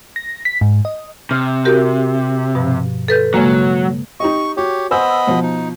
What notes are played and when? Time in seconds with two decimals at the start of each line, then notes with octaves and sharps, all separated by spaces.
0.16 A#6
0.45 B6
0.61 G#2
0.85 D#5
1.31 C3 F6
1.65 F#4 G4 A#4
2.55 G2 B2 F3
3.08 A4 B4 G6
3.34 C#3 F#3 G#3 A#3
4.20 D#4 G4 D#5 C#6
4.57 F#4 G4 C#5
4.91 B3 C5 D#5 G#5 B5 E6
5.27 B2 F3
5.42 D#4